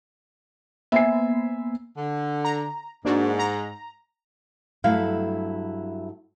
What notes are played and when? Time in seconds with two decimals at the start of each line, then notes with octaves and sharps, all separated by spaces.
0.92 A#3 B3 E5 G#5 C7
1.96 D3
2.44 A#5
3.05 G#2 A#3 D4 F#4
3.39 A#5
4.84 G2 F#3 A3 E4 F5